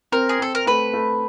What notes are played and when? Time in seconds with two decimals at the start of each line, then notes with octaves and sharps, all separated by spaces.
0.12 C4 A#4
0.29 G#4
0.39 C4 A4
0.55 A#4
0.66 A3 B4
0.94 A3